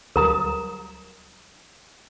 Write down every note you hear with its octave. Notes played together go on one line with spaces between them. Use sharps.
D2 F#3 G3 A#4 A#5 D#6